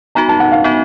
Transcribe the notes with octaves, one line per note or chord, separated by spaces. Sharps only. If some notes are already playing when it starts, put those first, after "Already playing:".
B3 D#4 F#4 A#5
A5
F#5
F5
B3 D#4 F#4